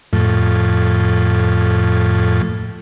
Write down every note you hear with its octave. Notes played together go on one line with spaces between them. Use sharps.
F2 A2